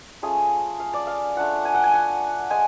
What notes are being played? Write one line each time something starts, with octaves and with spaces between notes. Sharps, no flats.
A3 C#4 F4 G#4
F5
D5
F5
A3 D4 F4 F#5
G#5
F#5
G#5
F#5
G#3 G#5